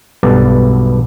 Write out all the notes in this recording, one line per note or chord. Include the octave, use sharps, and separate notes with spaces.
B1 G2 B3 A4 B4 D5